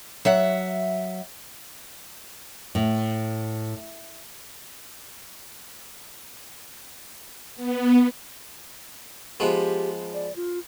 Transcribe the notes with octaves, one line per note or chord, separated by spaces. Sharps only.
F#3 E5 F#5
A2
B3
F3 G#3 B3 G4
D5
F4